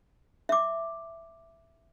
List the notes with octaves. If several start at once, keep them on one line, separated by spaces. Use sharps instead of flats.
E5 D6